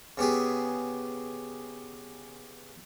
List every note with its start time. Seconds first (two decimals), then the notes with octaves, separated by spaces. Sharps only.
0.17 C#3 B3 G4 G#4